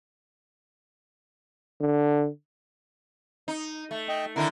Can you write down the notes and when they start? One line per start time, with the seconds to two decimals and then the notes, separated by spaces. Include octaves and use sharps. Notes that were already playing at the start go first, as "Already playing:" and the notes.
1.80 D3
3.48 D#4
3.91 A3
4.09 D#5 G5
4.36 D3 D#3 D4 E4 A#4